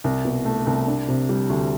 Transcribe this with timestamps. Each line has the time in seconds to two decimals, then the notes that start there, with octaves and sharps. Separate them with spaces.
0.04 C2
0.25 B2
0.45 A3
0.67 C2
0.87 D4
1.08 C3
1.29 G3
1.50 D2